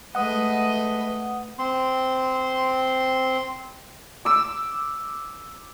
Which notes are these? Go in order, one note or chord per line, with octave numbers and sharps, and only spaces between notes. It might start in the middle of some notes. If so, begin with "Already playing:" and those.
G#3 A3 B4 D#5 F#5 D#6
C4 C6
D6 E6